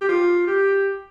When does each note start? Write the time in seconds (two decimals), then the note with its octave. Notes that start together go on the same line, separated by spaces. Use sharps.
0.01 G4
0.09 F4
0.47 G4